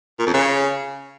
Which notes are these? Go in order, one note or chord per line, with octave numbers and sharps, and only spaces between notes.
A#2
F2
C#3